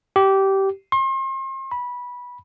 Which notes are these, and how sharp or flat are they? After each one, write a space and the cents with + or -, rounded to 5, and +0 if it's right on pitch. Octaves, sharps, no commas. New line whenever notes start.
G4 -15
C6 +40
B5 -15